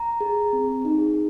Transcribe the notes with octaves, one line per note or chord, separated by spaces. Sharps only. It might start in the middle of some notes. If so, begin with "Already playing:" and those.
Already playing: A#5
G#4
C4
D#4 G#4